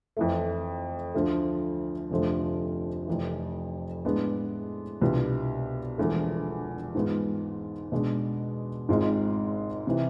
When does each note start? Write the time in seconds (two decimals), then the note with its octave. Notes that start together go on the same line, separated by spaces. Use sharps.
0.17 F2 E3 A3
1.14 D2 D3 F3 A3
2.11 F1 F2 D3 F3 A3
3.07 F1 F2 E3
4.05 A2 G#3 B3 D4
5.01 C2 B2 B3 D4 F4
5.98 E1 E2 D3 F3 A3
6.95 G#2 G#3 B3 F4
7.92 B2 G#3 D4
8.89 G#1 G#2 G#3 C4 F4
9.87 C3 E3